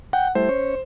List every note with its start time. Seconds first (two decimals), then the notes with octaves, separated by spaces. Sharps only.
0.13 F#5 G5
0.35 G3 A3 E4 C5
0.49 C#4 C#5